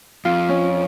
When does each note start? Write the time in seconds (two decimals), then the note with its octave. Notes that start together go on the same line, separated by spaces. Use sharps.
0.25 F2 F4
0.49 C#4